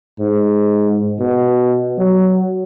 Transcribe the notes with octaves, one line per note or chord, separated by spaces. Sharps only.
G#2
B2
F#3